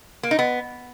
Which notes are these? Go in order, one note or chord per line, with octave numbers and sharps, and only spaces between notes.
A#3
D#4
B3